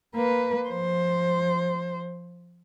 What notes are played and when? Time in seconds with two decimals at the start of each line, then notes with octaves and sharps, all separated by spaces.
0.15 A#3 B4
0.68 F3 C5